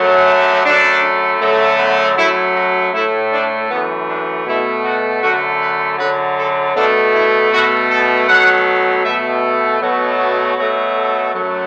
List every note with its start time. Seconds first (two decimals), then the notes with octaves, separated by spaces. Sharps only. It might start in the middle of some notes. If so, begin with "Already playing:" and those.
Already playing: F#2 F#3 A3
0.64 F#2 F#3 A3 D4
1.41 F#2 D3 F#3 A3
1.78 B3
2.16 F#2 F#3 A3 E4
2.55 F#4
2.93 A2 A3 E4
3.31 D4
3.70 F#2 E3 A3 B3
4.08 D4
4.45 B2 A3 E4
4.84 F#4
5.22 F#2 D3 A3 F#4
5.60 B4
5.98 F#2 D3 F#3 B4
6.37 A4
6.75 B2 A3 D4
7.13 E4
7.51 B2 A3 F#4
7.89 A4
8.27 B2 F#3 A3 F#5
9.04 B2 A3 E5
9.80 B2 F#3 A3
10.56 B2 F#3 A3 F#4
10.95 A4
11.33 F#2 F#3 A3